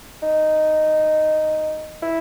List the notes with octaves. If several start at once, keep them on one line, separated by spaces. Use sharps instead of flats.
D#4
E4